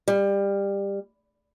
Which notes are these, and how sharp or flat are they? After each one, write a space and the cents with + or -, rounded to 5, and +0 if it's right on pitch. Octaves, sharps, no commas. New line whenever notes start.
G3 +20